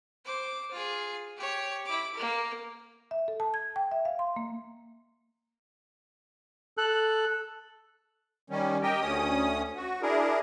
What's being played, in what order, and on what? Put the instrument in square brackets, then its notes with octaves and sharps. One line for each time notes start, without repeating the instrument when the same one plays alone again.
[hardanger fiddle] C5 D6
F4 G#4
G4 C#5
E4 D6
A#3 A#4
[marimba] E5
A4
A5
G#6
G5
E5
F5
C6
A#3
[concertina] A4 [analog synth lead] F#6
[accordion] D#3 G3 C#4
G4 A#4 D#5 G5
D2 C#4 D#6
F#4
D4 E4 G#4 A#4